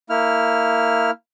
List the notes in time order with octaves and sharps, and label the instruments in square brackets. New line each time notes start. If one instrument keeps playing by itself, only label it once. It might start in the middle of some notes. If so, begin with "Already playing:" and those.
[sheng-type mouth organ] A#3 E4 F6